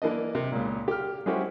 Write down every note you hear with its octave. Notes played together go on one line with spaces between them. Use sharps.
E3 A#3 D4 D#5
C3
C#2 A#2
G4 F6
G#3 C#4 E4 F#4 G4 C5